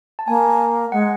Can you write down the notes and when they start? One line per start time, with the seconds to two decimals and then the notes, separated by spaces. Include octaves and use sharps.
0.19 A5
0.28 A#3 G#5
0.92 G#3 F#5